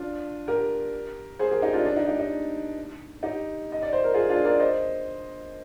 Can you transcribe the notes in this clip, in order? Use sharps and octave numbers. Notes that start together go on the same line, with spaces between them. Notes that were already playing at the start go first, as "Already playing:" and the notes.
Already playing: D4 F4
G4 A#4
G#4 C5
G4 A#4
D#4 G4
D4 F4
D4
D#4
D#4 G4
D#4
D#4 G4
D#5
D5
C5
A#4
F4 G#4
D4 F4
A#4 D5
C5 D#5